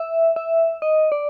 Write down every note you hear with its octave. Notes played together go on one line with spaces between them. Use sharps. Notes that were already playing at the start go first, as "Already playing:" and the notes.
Already playing: E5
E5
D#5
D5